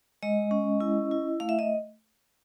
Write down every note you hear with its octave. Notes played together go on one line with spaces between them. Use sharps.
G#3 D#5
C#4
E4
E4
A3 F5
E5
D#5